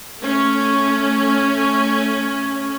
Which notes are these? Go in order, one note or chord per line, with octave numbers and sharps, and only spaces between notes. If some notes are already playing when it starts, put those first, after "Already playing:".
A3 C#4